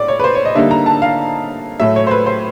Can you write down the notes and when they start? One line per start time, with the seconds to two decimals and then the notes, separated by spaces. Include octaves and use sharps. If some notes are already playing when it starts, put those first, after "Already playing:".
Already playing: A2 A3 D5
0.08 C#5
0.19 B4
0.24 C5
0.35 C#5
0.45 D#5
0.55 D3 G3 A#3 D#4 E5
0.71 A#5
0.86 A5
1.02 F5
1.80 A2 F#3 A3 E5
1.96 C#5
2.07 C5
2.11 B4
2.26 C5